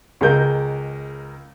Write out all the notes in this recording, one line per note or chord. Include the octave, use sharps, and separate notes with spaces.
C#2 G#3 A#4 G6